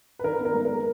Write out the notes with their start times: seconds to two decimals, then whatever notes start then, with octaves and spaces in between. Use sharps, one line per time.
0.19 B4
0.24 D#3 A#4
0.40 B3
0.45 A#4
0.54 G#3
0.65 A#4